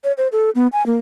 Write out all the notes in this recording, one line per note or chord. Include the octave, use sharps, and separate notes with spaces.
C#5
C5
A4
B3
G#5
A#3